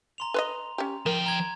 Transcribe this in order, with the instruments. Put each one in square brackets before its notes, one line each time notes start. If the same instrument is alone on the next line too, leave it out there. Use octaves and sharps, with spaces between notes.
[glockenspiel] A#5 C6 F7
[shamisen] B4 C5 D#5
C#4 G4
[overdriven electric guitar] F3 G5 [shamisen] A#4
[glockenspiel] A#5 G#6